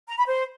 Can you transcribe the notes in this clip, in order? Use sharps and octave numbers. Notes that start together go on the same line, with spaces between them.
A#5
B5
C5